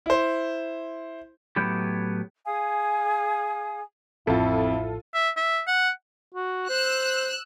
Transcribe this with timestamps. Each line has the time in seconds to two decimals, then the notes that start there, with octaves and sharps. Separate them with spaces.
0.06 E4 C5
1.56 A2 F#3 B3 E4 G4
2.45 G#4 F5 G#5 D#6
4.27 A1 F2 A2 F3 E4 F4 A4
5.14 E5
5.37 E5
5.67 F#5
6.35 F#4
6.69 C5 E6 F#6